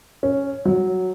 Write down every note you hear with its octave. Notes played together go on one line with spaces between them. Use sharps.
C#4
F#3